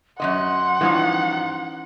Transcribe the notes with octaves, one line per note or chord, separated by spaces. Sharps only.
F#2 C#3 D#5 F#5 C6
G2 E3 F3 C#4 D#4